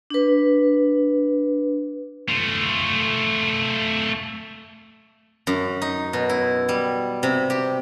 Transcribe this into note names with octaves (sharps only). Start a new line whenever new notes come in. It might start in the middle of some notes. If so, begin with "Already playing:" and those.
D4 B4
A3 F4
F#2
D#4
B2
E4
G3
C3
G4